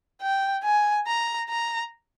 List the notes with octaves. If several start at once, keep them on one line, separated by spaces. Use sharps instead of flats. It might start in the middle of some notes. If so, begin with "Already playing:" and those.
G5
G#5
A#5
A#5